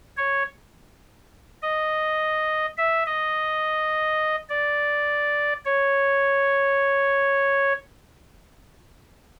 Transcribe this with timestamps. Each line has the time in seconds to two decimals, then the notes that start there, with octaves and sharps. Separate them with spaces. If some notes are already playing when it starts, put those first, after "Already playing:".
0.17 C#5
1.62 D#5
2.77 E5
3.06 D#5
4.50 D5
5.65 C#5